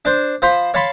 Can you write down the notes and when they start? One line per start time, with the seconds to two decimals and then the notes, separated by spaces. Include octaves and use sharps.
0.05 D4 C5
0.42 F3 C5 B5 C6
0.74 C#5 F5 A5 B5 C6